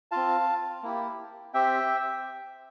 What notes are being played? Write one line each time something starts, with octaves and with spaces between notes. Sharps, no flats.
C4 F4 F5 A5
A#3 E4 G4
C4 G4 E5 G5